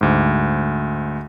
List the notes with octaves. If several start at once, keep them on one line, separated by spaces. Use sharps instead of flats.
D2 G#2